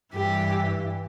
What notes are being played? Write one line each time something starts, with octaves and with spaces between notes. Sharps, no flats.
G2 E3 G4